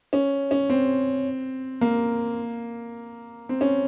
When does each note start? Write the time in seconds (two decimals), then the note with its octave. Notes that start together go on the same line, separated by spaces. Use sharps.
0.13 C#4
0.51 C#4
0.70 C4
1.81 A#3
3.49 C4
3.61 C#4